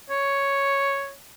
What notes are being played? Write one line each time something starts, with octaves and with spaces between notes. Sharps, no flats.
C#5